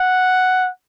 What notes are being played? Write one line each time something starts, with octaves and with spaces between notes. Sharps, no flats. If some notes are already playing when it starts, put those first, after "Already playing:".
Already playing: F#5